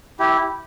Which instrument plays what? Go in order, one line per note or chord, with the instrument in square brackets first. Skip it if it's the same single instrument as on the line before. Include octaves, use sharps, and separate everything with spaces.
[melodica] E4 G4